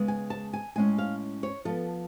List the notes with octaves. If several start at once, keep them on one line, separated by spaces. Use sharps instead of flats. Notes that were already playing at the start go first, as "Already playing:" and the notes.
Already playing: C#3 G#3 B3
G#5
A5
G#5
A2 G#3 C#4 G#5
F5
C#5
F3 B3 A4